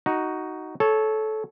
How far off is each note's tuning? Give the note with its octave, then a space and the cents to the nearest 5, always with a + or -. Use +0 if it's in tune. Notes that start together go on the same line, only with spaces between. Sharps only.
D#4 +0 F#4 +5
A4 -20 C#5 +0